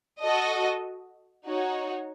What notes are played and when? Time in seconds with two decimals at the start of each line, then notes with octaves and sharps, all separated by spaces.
0.21 F#4 A4 D#5
1.46 D#4 F#4 C#5